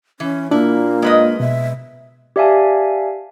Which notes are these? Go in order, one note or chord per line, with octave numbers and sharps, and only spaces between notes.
E3 C#4
A#2 A#3 D4 E4
G#3 B4 D#5
B2 E5
G4 D5 E5 F5 G#5 A5